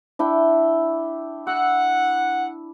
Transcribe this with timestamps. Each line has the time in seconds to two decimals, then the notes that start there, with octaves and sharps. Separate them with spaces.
0.19 D4 E4 G5
1.47 F#5 E6